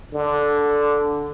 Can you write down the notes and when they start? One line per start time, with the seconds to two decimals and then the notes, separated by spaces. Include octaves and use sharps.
0.13 D3